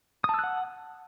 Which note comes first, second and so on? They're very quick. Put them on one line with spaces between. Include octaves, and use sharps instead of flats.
D#6 A5 E6 F#6 F#5